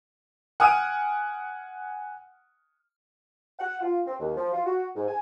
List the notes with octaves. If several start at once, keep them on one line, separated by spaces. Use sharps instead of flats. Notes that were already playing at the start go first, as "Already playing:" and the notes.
F#5 G#5 D#6 F6 D7 D#7
F#5
F4
C4
D#2
F3
F4
F#4
G#2
G#5